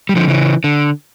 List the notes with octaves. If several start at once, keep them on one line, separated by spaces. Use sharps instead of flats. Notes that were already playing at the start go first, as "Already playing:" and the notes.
G3
D3 F3
C#3 E3
D3